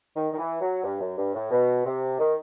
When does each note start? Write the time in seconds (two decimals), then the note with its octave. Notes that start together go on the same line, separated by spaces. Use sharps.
0.16 D#3
0.32 D#3
0.38 E3
0.61 F#3
0.83 G2
1.00 F#2
1.17 G2
1.34 A2
1.51 B2
1.85 C3
2.19 D#3